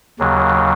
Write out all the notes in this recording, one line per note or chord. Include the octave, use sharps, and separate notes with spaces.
D#2 C#3 F#3